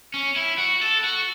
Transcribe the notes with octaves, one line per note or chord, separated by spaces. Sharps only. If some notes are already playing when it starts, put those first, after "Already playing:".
C#4
E4
F#4
A4
F#4